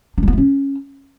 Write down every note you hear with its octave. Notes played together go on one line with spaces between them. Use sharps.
D4
G3
B3
A3
C#4